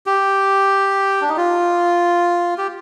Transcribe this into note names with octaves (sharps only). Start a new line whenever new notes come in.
G4
D4
D#4
F4
G4